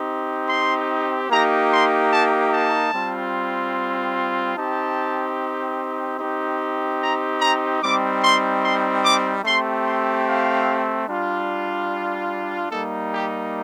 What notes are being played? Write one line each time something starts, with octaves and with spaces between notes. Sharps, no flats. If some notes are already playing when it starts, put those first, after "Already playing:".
Already playing: C4 D#4 G4
C6
A#3 D#4 G4 A#5
C6
A5
A5
G3 C4 F4
C4 D#4 G4 A5
C4 D#4 G4
A#5
A#5
G3 C4 D#4 D6
C6
C6
D6
A3 C4 G4 C6
C6
F5
G3 D4 F4
G3 A#3 D#4 A4
G4